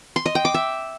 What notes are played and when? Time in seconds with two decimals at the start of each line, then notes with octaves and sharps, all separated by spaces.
0.16 C6
0.26 D#5
0.35 G5
0.45 D6
0.54 E5